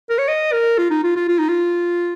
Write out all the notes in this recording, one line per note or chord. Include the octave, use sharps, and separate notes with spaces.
A#4
C#5
D#5
A#4
F4
D#4
F4
F4
F4
D#4
F4